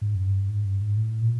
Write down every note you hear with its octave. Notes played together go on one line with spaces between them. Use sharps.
G#2
F#2
G2
G#2
G2
G#2
A2
A#2